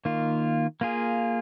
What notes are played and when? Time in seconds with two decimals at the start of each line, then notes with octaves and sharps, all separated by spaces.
0.05 D#3 A#3 F4
0.81 A#3 F4 G#4